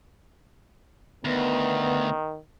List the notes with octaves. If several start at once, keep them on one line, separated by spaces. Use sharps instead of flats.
D2 D#3 B3